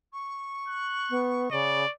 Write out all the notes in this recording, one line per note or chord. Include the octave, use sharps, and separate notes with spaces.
C#6
F#6
B3
C#3 D5